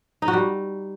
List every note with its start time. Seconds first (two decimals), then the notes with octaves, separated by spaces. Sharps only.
0.22 D#4
0.28 F#4
0.33 G3